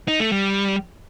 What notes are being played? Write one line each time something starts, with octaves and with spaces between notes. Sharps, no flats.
D#4
A3
G3